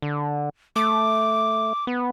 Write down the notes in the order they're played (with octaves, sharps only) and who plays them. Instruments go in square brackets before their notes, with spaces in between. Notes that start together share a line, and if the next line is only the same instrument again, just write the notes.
[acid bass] D3
[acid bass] A3 [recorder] D6
[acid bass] B3